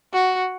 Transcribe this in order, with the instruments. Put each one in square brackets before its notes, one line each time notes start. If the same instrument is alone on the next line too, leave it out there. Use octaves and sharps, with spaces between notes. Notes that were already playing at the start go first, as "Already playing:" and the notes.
[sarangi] F#4